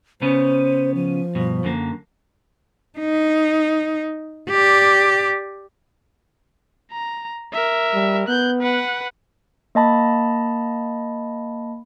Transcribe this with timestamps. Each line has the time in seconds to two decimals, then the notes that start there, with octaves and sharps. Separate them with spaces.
0.22 C#3 B3 C#4 C5
0.95 F3
1.35 G2 B2
1.64 F#2 D3 A#3
2.99 D#4
4.50 G4 D5
6.92 A#5
7.53 A#4 E5
7.94 G3
8.28 B3 F#6 G6
8.61 B4 F#5
9.75 A#3 D#5 A5 B5